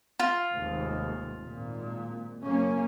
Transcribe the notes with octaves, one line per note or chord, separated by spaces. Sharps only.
F4
F1 D#2 G#2
G#1 A#2
F#1 A#3 C#4